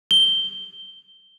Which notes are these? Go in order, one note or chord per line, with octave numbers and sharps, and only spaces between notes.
G7